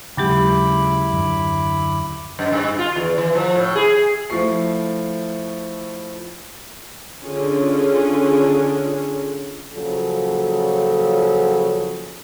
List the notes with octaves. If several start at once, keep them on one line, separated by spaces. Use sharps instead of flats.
D#2 C#3 F#3 G#3 E4 G4 B5 D6
F#2 D3
F#2
G2
F4
E2
E3
F3
A2
G#4
F3 A3 E4 C#6 C7
D3 C#4 F4 G#4
A#2 C#3 F3 F#3 F4 A4